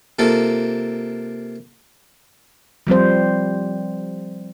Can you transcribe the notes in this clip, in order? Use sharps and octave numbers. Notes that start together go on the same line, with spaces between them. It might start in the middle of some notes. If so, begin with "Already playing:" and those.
C3 A#3 F4 A4
F3 G3 C4 C5